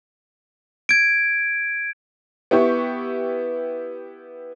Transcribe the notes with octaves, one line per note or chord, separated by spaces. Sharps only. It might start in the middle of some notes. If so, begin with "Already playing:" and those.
G#6 D7
B3 E4 G4 C#6